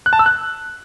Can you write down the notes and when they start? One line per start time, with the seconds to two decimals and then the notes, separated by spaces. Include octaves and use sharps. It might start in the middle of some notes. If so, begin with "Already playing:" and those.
0.06 F#6
0.13 A5
0.19 E6
0.26 F#6